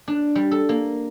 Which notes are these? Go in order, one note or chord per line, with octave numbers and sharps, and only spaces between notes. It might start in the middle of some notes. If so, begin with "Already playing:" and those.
D4
G3
A4
A#3